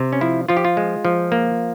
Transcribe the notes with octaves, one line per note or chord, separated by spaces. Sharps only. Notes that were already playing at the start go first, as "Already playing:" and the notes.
Already playing: C3
C#4
F3 E4
F3 F4
G4
F4
G#3
F3
A#3